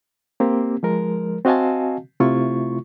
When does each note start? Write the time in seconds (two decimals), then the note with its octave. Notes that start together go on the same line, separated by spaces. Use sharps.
0.40 A#3 C4 G4
0.83 F3 G#3 A#4
1.45 C4 F#4 D#5 F5 G#5 A5
2.20 C3 A3 E4 F4 C#6